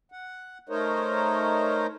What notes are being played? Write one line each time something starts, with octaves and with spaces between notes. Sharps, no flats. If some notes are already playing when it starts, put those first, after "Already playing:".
F#5
A3 D#4 A#4 C5 C#5 D#5